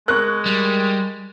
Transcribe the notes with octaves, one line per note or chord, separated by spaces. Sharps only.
G#3 A#4 C#6 F#6
G3